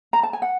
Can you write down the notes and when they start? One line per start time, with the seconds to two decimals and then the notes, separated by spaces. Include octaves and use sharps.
0.13 A#5
0.23 A5
0.33 G#5
0.42 F#5